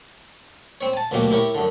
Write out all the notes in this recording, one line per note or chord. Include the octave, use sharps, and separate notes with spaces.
C4 C#5
G#5 A5
D2 B2 F#3 A#3 G4
E4 G4 A#4 C#5
F#2 D3